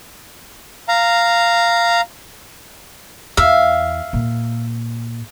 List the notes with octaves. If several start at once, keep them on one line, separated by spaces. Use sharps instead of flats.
F5 A#5
E2 E5 F5
A#2